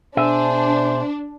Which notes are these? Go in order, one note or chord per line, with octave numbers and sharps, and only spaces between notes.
B2 D4 G#4 C5 E5